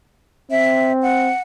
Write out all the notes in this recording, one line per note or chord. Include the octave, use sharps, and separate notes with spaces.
C4 E5
F#5